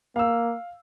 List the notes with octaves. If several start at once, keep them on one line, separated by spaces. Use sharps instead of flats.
A#3 F5 E6